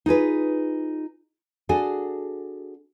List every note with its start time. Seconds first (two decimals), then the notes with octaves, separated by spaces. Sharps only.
0.06 D#4 F4 G#4 B4
1.69 D4 F#4 G#4 A4